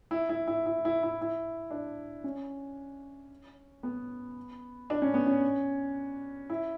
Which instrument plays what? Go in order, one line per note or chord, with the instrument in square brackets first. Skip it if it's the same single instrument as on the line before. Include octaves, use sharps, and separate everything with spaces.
[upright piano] E4
E4
E4
E4
E4
E4
E4
D4
C#4
B3
D4
C#4
B3
C#4
E4